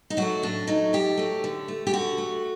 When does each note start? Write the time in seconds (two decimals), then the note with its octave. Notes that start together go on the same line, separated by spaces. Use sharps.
0.10 D#4
0.17 F#3 A3 F#4
0.43 A2 D4
0.67 F#3 A3 D#4
0.93 A2 G4
1.17 F#3 A3
1.44 D3
1.68 A3
1.87 G4
1.93 D3 F#4
2.18 A3